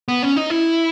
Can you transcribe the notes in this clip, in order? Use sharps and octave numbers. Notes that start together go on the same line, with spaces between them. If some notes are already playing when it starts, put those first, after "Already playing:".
B3
C#4
D#4
E4